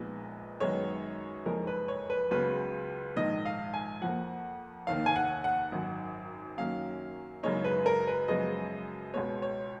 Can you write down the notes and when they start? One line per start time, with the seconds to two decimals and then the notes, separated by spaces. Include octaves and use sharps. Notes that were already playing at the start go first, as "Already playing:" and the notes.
Already playing: A#1 A#2 G#3 B3 D#4
0.60 F#2 D#3 G#3 B3 D#4 C#5
1.46 F#1 F2 F3 G#3 D#4 A#4
1.67 B4
1.88 C#5
2.10 B4
2.31 C#2 C#3 F#3 B3 B4
3.16 A#1 G#2 D#3 D#5
3.45 F5
3.74 G#5
4.02 F2 F3 A#3 F#5
4.87 F1 D#2 D#3 A#3 F5
5.06 G#5
5.16 F#5
5.44 F#5
5.72 G#1 F#2 D#3
6.58 F#2 D#3 F#3 A#3 C#4 F5
7.43 F#1 F#2 C#3 G#3 D#4 C#5
7.64 B4
7.86 A#4
8.07 B4
8.28 F#2 C#3 F3 G#3 B3 D#5
9.14 C#2 B2 G#3 B3 C#5
9.42 C#5